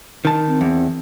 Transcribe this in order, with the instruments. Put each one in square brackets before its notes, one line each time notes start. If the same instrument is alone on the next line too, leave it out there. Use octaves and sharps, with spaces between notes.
[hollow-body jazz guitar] D#3 A5
[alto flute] C4
[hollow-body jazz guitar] E2